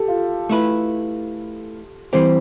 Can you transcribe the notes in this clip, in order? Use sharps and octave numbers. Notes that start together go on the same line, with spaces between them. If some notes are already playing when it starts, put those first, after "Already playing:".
Already playing: G4 A4
F4
A3 E4 B4
E3 G3 C4 G4 C5